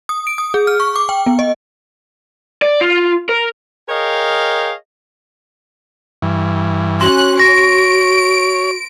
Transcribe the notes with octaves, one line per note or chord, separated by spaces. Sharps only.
D#6
D7
D#6
G#4
F6
C#6
D6
G5
B3
D#5
D5
F4
A#4
G#4 A#4 C#5 D#5 F5 G5
G2 E3
C#4 F#4 C6 F#6
C#5 A#6 D7